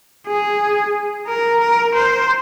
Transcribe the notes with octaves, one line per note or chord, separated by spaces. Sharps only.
G#4
A#4
A#4
C5